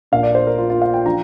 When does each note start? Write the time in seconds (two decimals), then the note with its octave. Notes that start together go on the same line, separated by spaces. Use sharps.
0.12 A#1 A#2 A#3 D4 F5
0.23 D5
0.35 C5
0.47 A#4
0.58 F4
0.70 F4
0.82 F5
0.94 G5
1.05 F3 D4 A#5